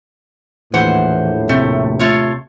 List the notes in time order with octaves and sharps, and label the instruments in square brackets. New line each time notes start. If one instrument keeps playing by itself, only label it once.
[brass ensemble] A#1 D#2 A2 [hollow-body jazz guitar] E3 [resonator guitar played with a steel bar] C5 F#5
[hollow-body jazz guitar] C3 [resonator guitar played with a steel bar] A3
[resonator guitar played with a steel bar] A3 F4 C#5